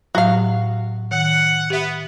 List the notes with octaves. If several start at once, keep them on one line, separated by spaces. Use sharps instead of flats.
A2 F#3 F#4 F5
D#3 F#5
B3 G4 E5